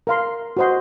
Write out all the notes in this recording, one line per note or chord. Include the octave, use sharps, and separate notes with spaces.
A#4 F5 C6
F#4 C5 D#5 F#5 C6